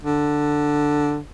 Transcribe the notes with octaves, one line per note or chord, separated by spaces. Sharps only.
D3